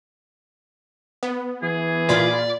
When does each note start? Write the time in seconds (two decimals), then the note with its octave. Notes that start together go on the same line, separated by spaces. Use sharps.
1.23 B3
1.63 E3 G#4
2.09 A#2 F4 D5 B5